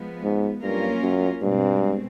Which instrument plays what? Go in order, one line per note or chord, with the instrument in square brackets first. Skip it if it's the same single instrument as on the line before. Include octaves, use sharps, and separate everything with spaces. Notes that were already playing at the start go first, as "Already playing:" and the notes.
Already playing: [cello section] F3 G#3 B3
[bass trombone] G#2
[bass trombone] G2 [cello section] F#3 A#3 C#4 F4 A#4
[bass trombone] F#2
[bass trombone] G2 [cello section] B2 G#3 C4